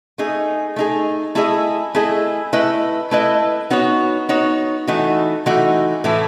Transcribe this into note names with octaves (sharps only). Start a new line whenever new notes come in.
A3 D#4 G#4
A3 D#4 G#4
A3 E4 G#4 D#5
A3 E4 G#4 D#5
A3 E4 B4 D#5
A3 E4 B4 D#5
B3 D#4 F#4 C#5
B3 D#4 F#4 C#5
E3 A3 D#4 F#4
E3 A3 D#4 F#4
A2 E3 A3 E4